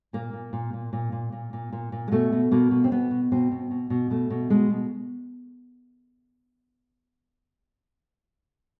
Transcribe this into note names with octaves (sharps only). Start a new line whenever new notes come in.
A#2 A#3
A#2
A#2
A#2
A#2
A#2
A#2
A#2
A#2
A#2
G#3
B2 A3
B2
B2 A#3
B2
C4
B2 B3
B2
B2 C4
B2
B2
B2
B2 A3
B2
B2 G#3
B2